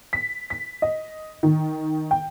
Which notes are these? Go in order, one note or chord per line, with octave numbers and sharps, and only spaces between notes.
B6
B6
D#5
D#3
G5